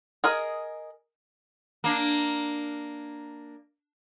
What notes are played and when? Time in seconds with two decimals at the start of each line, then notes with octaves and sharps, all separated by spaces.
0.24 G#4 A#4 D#5
1.84 A#3 D4